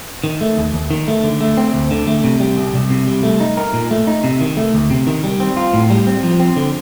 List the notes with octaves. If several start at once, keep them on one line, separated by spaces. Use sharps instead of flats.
D#3
A3
D#2
D#2
D#3
A3
D3
A3
C4
D2
D3
A3
C3
G3
C2
C2
C3
G3
A3
D#4
A#4
A#2
A3
D#4
C3
D#3
A3
D2
C3
D#3
G3
C4
F4
A2
G3
C4
F3
C4
D3